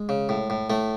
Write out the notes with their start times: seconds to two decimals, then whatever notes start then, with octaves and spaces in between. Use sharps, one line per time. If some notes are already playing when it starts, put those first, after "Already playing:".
Already playing: G#3
0.09 C#3
0.29 A2
0.50 A2
0.70 A2 A3